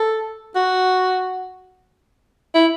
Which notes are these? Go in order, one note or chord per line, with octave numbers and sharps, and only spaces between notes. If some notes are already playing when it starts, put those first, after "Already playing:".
Already playing: A4
F#4
E4